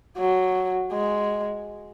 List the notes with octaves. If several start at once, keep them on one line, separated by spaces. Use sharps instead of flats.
F#3
G#3